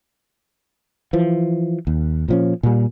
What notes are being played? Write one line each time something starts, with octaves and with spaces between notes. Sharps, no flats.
E3 F3
D#2
A#2 F3 C#4
A#2 G3